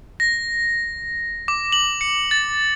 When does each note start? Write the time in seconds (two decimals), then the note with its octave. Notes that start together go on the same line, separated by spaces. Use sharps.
0.20 A#6
1.48 D6
1.72 F#7
2.01 C#7
2.31 A6